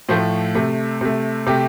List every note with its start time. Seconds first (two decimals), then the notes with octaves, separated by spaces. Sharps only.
0.09 A2 F3 A3 C5
0.55 C3 A3
1.01 C3 A3
1.47 C3 A3 G4